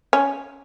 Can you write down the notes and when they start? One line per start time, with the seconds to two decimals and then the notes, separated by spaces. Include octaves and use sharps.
0.13 C#4